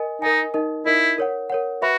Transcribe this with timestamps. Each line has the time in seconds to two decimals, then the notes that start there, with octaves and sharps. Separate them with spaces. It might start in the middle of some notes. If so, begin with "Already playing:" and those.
Already playing: A#4 D#5 G#5
0.22 D#4 A#4 D#5 G#5
0.54 D#4 A#4 D#5
0.86 D#4 E4 A#4 D#5
1.18 A#4 C#5 F#5
1.50 A#4 C#5 F#5
1.82 F#4 B4 E5 B5